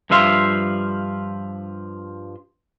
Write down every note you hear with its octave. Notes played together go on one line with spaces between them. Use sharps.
G2 F3 E5 F5 C6